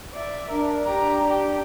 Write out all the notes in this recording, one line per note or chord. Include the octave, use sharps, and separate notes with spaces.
D5 E5
D4 A#4
G4 A#5
G4